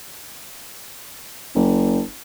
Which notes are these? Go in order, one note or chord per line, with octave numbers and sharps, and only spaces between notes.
F#1